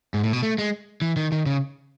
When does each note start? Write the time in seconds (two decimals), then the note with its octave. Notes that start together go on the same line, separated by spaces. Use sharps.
0.14 G#2
0.23 A2
0.33 B2
0.42 A3
0.58 G#3
1.02 E3
1.17 D#3
1.32 D#3
1.46 C#3